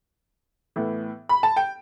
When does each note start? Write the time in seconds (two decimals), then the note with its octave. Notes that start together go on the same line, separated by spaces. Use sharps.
0.76 A2 E3 B3
1.29 B5
1.43 A5
1.57 G5